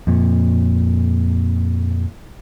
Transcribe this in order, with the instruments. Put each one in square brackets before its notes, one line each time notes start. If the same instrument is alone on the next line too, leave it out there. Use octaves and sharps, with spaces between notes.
[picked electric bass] F2 A#2